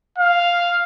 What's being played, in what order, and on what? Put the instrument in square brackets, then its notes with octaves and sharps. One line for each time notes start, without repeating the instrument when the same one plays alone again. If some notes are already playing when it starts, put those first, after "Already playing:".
[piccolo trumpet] F5